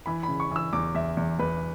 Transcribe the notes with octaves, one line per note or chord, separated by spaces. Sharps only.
E3 B5
B5
C#3
C#6
E3 E6
E2 D6
E2 E5
E2
E2 B4